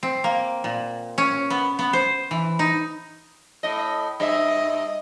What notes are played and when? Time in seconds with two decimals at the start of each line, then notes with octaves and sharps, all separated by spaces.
0.03 C4
0.24 A#3
0.64 A#2
1.18 C#4
1.50 B3
1.79 B3
1.93 C5
2.31 E3
2.59 D#4
3.63 A2 D#5
4.20 G2 D#5 E5